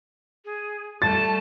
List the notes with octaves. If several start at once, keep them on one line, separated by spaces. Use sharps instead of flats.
G#4
G3 A3 A5 A6